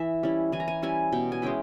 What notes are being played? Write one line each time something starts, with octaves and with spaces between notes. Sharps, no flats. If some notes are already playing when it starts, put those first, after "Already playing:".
Already playing: E3 E5
G3 C#4 E4
E3 G#5
A#5
G#5
G3 C#4 E4 G#5
B2 G5
G#5
G#3 C#4 E4 G5